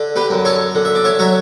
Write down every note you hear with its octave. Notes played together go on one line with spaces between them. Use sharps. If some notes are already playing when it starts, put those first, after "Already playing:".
Already playing: D3
G4 B4
F#2
A4 C#5
D3
E5
D5
C#5 E5
F#3 C#5 E5